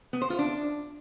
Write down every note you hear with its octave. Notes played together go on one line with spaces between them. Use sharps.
B3
C5
F4
D4